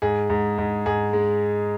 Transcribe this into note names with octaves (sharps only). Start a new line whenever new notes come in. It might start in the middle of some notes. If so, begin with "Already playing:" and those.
G#2 G#4
G#2
G#2
G#2 G#4
G#3